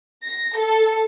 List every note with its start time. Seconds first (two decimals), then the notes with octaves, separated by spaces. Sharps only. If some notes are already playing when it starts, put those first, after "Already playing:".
0.24 A#6
0.55 A4